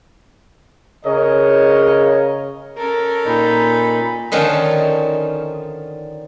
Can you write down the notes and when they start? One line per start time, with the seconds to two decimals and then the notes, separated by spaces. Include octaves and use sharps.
1.06 C#3 A#4 C#5 D#5
2.78 C#4 A4 A#4
3.26 A#2 D#4 B5
4.32 D3 D#3 F3 C#4 D#4